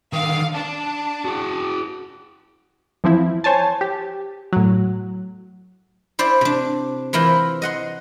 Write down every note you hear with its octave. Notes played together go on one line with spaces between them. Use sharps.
D3 D#3 F5
D4 A5
F#4 G#4
E3 F3 C4 E4
C5 C#5 G#5 A5
G4
A2 F#3
E4 C5 D5
C3 D4
E3 E4 F4 A#4 C5
D#5 F#5 C6